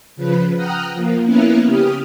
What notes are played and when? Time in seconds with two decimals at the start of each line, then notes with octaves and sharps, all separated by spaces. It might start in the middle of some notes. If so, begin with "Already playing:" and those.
0.16 C#3 F3 B4
0.54 F#5 G5 A#5 D#6 F6 F#6
0.94 F3 A#3
1.24 A#3 B3 C#4 E4 A#4 B4
1.65 C#3 G4 D#6 F6